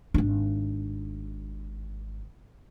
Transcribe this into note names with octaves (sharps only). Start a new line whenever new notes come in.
G#1 D4